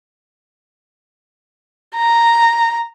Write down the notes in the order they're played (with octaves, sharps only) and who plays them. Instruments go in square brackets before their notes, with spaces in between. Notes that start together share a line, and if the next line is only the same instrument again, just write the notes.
[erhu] A#5